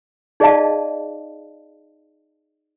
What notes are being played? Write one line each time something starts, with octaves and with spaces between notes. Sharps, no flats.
D#4 G#4 D5 D#5 F5 A5